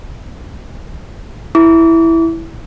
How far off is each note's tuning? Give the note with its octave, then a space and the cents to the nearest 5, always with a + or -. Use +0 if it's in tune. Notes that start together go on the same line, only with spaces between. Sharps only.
E4 +0 D6 -35